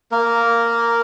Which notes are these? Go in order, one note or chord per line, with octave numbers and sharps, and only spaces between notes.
A#3 A#4